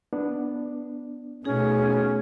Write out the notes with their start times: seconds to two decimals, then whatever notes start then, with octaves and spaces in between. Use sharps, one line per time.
0.13 B3 D4
1.45 B2 A3 C#4 D#4 G#4